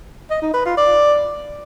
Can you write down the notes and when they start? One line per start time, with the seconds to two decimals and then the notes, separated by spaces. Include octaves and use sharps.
0.31 D#5
0.42 D#4
0.54 B4
0.66 F4
0.77 D5